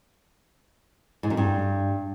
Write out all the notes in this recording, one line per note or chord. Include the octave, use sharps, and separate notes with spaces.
G#2
F#2
G2